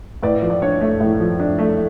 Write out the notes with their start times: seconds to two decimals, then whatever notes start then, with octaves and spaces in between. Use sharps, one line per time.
0.23 A2 B4 D5
0.42 F3
0.50 D5
0.62 D4 C#5
0.81 A3
1.01 A2
1.20 F3
1.40 D4
1.59 A3